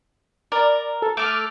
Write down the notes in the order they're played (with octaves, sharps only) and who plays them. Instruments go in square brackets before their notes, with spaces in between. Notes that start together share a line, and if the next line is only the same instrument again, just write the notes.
[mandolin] A#4 [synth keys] D5
[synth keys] A4
[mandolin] A3 A4 [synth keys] D6 F6